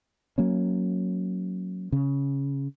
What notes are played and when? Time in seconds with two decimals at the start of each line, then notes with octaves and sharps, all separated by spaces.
0.38 F#3 A#3 C#4
1.92 C#3